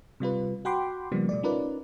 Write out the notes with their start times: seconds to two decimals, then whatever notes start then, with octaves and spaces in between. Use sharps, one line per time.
0.20 C3 G3 F4 B4
0.65 F#4 F#5 G5 B5 C6 D6
1.12 C#3 F3 G3 A#3 B3
1.29 B2 A3 D5
1.43 C#4 D#4 F4 A#4 B4 D5